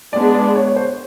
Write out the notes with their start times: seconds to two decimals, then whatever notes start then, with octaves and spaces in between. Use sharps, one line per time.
0.13 G#3 B3 D4 D5
0.35 D5
0.56 C#5
0.67 C#5
0.76 C5